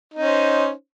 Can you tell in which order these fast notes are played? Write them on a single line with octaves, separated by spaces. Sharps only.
D#4 C#4 C5